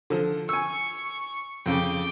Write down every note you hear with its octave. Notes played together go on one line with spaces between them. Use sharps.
D3 F3
G#5 C#6 E6
F2 C#3 G5 D6